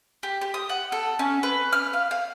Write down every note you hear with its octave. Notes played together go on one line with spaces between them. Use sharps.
G4
G4
D#6
F#5
A4
C#4
B4
F6
F5
F5